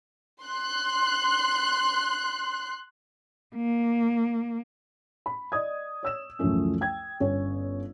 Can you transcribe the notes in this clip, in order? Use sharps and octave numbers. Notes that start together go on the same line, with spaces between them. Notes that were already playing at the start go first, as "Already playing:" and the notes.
C6 F#6
A#3
B5
D5 D#5 D#6 G#6
C#5 E6 E7
C#2 F#2 E3 F3 A3 C#4
G5 G#6
G1 C#4 C#5